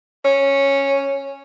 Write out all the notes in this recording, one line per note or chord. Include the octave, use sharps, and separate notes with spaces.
C#4